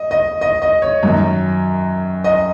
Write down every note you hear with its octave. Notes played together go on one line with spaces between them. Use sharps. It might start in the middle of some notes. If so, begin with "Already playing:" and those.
Already playing: D#5
D#5
D#5
D#5
C#5
F#2 D#3
D#5